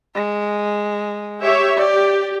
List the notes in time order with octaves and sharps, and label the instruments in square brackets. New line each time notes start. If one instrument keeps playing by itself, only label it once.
[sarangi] G#3
[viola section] G4 C#5 E5
[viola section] G4 [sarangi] D5